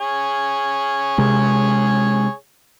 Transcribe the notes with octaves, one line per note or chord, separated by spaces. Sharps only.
G#4 C#5
C3 G#3